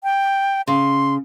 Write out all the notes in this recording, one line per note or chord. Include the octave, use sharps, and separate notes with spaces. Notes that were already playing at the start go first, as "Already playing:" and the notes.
G5
C#3 C6